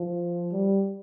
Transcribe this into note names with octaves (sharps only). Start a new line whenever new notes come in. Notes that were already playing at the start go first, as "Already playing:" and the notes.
Already playing: F3
G3